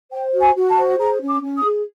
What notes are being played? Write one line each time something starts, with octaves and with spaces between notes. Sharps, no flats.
C5 G5
F#4
G#5
F#4
A5
C5
G#4 A#5
C#4
D6
C#4
D#6
G#4